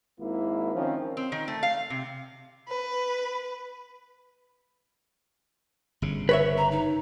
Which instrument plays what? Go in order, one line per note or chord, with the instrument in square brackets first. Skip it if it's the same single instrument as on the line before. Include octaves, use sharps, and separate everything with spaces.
[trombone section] G#1 G#2 A#3 E4
D#3 F3 C4 C#4
[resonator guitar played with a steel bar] C4
D#3
A3
F5
C3
[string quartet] B4
[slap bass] G1 C#3
[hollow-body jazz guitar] B4 C#5 E5
[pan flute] A#5
D#4